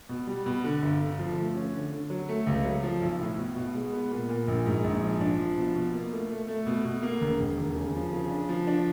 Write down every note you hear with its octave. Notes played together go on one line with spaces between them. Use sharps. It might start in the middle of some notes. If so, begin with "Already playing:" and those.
B2
G3
B2
D3
G1
D3
F3
A3
C#4
D3
D3
F#3
A3
C#2
F#3
F3
B1
A2
B2
B2
G#3
B3
A#2
A#2
A#1
G#2
A#1
F3
D4
F3
B2
B2
A#3
A3
A3
A3
B2
B2
A#3
E1
E1
D#2
C#3
F3
C#3
D4
F3
D4